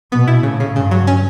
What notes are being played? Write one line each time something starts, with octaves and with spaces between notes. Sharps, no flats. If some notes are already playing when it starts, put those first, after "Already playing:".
B2 B3
E4
A2 C#3
C#3
G2 C#3
F#3
C#4